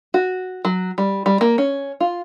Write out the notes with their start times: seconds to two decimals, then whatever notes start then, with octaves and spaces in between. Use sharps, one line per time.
0.14 F#4
0.65 F#3
0.98 G3
1.26 G3
1.41 A#3
1.58 C#4
2.00 F4